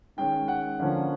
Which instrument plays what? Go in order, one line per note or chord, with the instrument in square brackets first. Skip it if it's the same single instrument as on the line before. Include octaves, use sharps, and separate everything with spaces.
[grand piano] D#3 G#3 C#4 G5
F#5
D3 F3 A#3 C#4